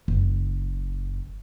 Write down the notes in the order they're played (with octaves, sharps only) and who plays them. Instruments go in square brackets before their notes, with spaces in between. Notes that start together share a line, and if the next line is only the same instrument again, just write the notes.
[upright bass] F#1